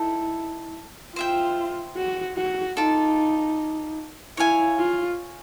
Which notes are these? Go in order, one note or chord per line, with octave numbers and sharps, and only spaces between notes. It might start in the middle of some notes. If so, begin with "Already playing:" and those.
Already playing: D#4 E4 A4
F4 C5 E5 G5
F#4
F#4
D#4 F4 A4 D5
E4 C#5 F5 G#5
F4